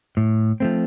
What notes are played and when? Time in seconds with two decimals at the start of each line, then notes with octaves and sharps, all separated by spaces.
0.17 A2
0.60 F3 A3 C4